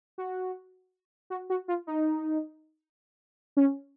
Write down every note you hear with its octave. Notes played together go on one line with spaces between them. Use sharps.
F#4
F#4
F#4
F4
D#4
C#4